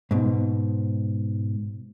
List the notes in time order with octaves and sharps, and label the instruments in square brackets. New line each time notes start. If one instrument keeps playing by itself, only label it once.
[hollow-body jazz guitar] G#2 B2